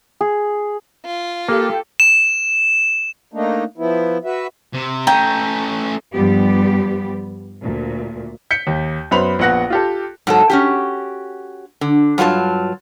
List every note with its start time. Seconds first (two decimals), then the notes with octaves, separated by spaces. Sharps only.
0.21 G#4
1.06 F4
1.49 A#3 G4 A4
2.00 E7
3.33 A3 A#3 D4 D#4
3.78 F3 B3 E4
4.25 F#4 B4 E5
4.73 C3
5.07 A3 C#4 G5 A#5
6.14 G2 F3 G3 B3 G4
7.63 D2 A#2
8.51 G6 B6 C#7
8.67 D#2
9.11 F#2 B3 C5 B5 C6 F7
9.39 A#1 B3 F#5 F#6 A#6
9.70 F4 G4 A4
10.27 G#2 F#3 A4
10.50 C#4 F#4 G4
11.81 D3
12.18 G2 F#3 F4 G#4 A5